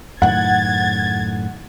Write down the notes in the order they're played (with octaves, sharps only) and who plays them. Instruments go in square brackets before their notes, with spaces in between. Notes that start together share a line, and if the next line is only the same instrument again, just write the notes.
[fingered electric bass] F#2 A2 D#3 [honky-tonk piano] F#5 [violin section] G#6 A6